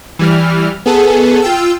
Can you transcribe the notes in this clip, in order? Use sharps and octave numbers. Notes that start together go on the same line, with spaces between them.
E3 G3 F6
B3 G#4 A4
F4 G5 E6